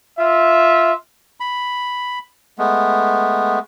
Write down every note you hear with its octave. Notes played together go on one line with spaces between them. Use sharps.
F4 E5
B5
G#3 A3 B3